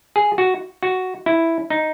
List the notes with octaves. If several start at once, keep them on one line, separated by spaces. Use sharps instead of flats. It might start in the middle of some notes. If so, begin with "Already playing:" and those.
G#4
F#4
F#4
E4
D#4